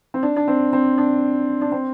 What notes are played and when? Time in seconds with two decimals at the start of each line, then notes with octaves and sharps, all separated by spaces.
0.14 C4
0.23 D4
0.36 D4
0.48 C4
0.73 C4
0.98 D4
1.61 D4
1.72 C4